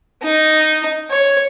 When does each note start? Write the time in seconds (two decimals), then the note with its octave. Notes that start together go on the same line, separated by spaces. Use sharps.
0.22 D#4
1.10 C#5